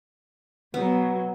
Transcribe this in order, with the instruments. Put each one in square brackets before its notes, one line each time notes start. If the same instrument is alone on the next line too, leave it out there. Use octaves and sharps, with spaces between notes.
[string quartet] B2 F#3 [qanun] B3